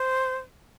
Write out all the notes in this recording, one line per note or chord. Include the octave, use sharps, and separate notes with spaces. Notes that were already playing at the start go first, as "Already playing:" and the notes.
Already playing: C5